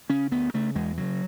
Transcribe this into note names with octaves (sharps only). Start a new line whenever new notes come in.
C#3 C#4
D2 B3
C#3 A3
E2 G#3
C#3 F#3